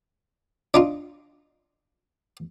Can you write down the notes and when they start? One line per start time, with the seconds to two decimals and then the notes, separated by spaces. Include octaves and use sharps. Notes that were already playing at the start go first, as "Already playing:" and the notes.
0.74 D4 D#4 F4